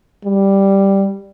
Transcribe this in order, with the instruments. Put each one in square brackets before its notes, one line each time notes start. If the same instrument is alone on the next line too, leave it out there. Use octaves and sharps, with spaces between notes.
[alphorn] G3